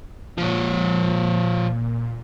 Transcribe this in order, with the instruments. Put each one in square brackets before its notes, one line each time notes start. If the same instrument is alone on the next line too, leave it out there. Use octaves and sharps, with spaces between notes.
[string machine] A#2 [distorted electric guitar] F3 C#5